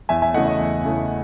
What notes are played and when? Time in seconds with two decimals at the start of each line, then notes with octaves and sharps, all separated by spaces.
0.09 E2 E5 G#5
0.22 E5 G#5
0.34 C#3 E3 A3 D#5 F#5
0.47 D#5
0.60 E2
0.85 C#3 E3 A3